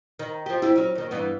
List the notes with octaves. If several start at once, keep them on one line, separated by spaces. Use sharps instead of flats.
D#3
F3 G4
E4 G4
F#3 C#4
D#2 D#3
G2 E3 B3